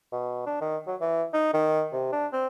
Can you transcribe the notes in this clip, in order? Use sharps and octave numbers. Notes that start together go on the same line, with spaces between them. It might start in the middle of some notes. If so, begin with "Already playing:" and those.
B2
D4
D#3
F#3
E3
D#4
D#3
C3
D4
C4